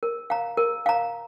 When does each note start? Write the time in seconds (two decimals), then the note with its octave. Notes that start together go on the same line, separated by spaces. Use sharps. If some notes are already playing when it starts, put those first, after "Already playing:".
0.03 A#4
0.30 F5 A#5
0.57 A#4
0.86 F5 A#5